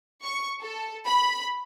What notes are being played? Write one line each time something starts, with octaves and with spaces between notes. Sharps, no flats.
C#6
A4
B5